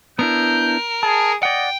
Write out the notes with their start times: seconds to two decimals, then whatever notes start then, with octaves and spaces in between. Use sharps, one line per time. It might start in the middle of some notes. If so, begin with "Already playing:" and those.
0.19 B3 D4 E4 A#4 G6
1.03 G#4 A5
1.43 D5 D#5 F#5 G5